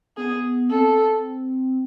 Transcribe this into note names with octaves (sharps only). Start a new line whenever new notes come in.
B3 G#4
C4 A4